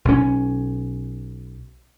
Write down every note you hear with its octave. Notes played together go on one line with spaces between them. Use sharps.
B1 C#4